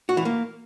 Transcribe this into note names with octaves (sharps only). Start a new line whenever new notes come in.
F#4
E3
A#3